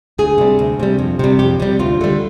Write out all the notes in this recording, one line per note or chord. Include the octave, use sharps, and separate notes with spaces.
D2 G#4
C3 G3
D2
C3 G3
F2
C3 G3
F2 G4
C3 G3
D2 F4
D3 G3